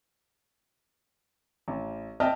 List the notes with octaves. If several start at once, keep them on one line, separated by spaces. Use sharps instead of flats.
A1
D#5 E5 G5 A5 F6